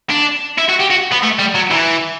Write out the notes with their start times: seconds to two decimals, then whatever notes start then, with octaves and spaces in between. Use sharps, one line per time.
0.10 D4
0.58 E4
0.69 F#4
0.80 G4
0.90 F#4
1.12 B3
1.23 A3
1.39 G3
1.55 F#3
1.71 E3